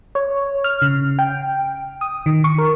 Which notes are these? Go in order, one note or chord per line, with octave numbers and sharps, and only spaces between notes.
C#5
F6
C#3
G5
D#6
D#3
C#6
A#4